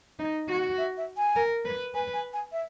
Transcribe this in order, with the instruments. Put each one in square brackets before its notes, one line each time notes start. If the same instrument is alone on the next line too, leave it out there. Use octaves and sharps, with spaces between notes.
[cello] D#4
F#4
[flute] E5
E5
G#5
[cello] A#4
B4
[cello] B4 [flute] G#5
[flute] G#5
G#5
E5